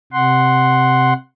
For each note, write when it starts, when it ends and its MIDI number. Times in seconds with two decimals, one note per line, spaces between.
0.13 1.13 48
0.13 1.13 78
0.13 1.13 84